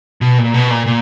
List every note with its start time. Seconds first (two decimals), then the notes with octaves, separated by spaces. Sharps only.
0.21 B2
0.38 A#2
0.54 B2
0.70 A#2
0.86 A#2